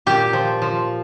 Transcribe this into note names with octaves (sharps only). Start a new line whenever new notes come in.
A#2 G4
F3
F3